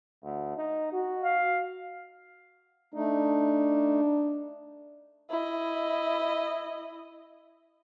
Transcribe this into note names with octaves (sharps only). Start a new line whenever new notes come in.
D2
D#4
F#4
F5
A3 D4 D#4
E4 D#5